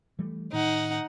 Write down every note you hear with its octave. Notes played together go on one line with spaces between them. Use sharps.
E3 G3 A3
A2 D#3 D#4 F#5